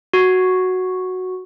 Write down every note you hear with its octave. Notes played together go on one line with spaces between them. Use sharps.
F#4